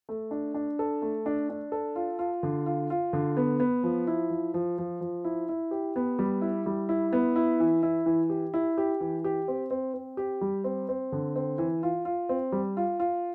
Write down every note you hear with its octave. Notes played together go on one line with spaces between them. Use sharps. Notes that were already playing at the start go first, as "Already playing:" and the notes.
A3
D4
D4
A4
A3
D4
D4
A4
F4
F4
D3
F4
F4
D3
B3
B3
F3
E4
F3
F3
F3
F3
E4
E4
G4
B3
G3
E4
G3
E4
B3
E4
E3
E4
E3
G4
E4
G4
E3
G4
C4
C4
C4
G4
G3
C4
C4
D3
C4
E3
F4
F4
C4
G3
F4
F4